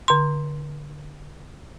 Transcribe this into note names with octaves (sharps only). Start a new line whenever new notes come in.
D3 C6